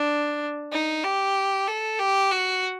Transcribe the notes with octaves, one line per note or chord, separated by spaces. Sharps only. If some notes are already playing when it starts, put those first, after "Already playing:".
Already playing: D4
D#4
G4
A4
G4
F#4